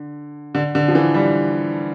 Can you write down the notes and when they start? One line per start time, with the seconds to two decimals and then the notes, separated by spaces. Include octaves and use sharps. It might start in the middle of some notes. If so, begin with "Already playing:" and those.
Already playing: D3
0.55 D3
0.75 D3
0.88 F3
0.95 E3
1.14 G3